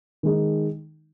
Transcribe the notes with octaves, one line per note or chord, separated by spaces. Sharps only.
D#3 G#3 D#4